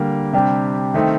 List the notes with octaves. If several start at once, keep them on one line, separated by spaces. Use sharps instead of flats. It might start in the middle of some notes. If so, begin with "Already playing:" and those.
Already playing: D3 G3 A#3
C3 G3 D4
D#3 A3 C4 D#4